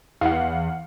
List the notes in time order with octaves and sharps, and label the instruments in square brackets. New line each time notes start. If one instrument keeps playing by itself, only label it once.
[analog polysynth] E2 [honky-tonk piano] F5 F#5